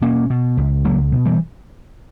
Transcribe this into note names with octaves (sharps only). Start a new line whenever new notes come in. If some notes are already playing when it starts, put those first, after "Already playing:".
B2 A#3 C#4
B2
C#2
C#2 F#3 A#3
B2
E3 G3